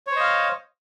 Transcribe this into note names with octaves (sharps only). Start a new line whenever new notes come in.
C5 C#5 D#5 F5